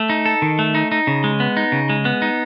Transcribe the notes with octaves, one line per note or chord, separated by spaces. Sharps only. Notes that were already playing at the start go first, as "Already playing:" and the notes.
Already playing: A3
D#4
A4
D#3
A3
D#4
D#4
C#3
G#3
B3
D#4
C#3
G#3
B3
D#4